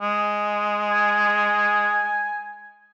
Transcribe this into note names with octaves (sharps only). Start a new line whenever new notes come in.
G#3
G#5